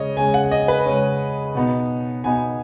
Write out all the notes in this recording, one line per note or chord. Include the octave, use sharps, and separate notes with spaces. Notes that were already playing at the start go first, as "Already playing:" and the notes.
Already playing: C#3 G#3 C#4 C#5 D#5
C#3 G#3 C#4 G#5
F#5
D#5
B4
C#3 G#3 C#4
B2 B3 D#4
B2 B3 D#4 G#5